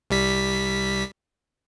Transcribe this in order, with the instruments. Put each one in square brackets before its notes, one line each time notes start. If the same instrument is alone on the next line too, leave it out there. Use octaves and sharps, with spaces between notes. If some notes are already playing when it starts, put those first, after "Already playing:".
[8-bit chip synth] C2 G3 B6